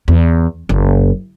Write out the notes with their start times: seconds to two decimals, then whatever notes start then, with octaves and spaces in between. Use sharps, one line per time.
0.08 E2
0.69 F#1